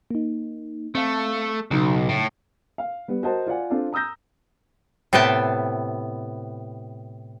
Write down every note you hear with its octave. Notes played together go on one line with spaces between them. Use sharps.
A#3 D#4
A3 C4 F5
B1 C#3 F#3 D#4
A2
F5
G3 B3
F#4 A#4 C5 D#5 A5
F4 D5 F#5 G#5
C4 D4 F4 A4 D5
A#5 D#6 E6 G6 A#6
A2 C3 B3 E5 G5 A5